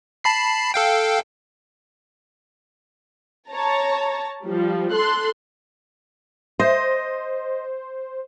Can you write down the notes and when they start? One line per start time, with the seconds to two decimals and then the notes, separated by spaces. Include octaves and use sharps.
0.24 A5 B5 C7
0.74 A4 F5 G5
3.51 C#5 A5 A#5
4.47 F3 G3
4.94 A4 C6 F#6
6.60 C5 D#5